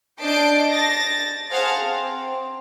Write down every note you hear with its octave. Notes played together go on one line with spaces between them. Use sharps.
D4 D#5 A5 G6 C7 D7
A6 A#6
G#4 C5 F5 F#5 A5
C4